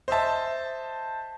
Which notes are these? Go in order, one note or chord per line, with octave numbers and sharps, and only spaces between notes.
C5 D#5 E5 A5